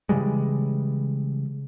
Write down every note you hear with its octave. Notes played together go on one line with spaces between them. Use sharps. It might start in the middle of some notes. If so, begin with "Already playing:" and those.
C#3 E3 G3 G#3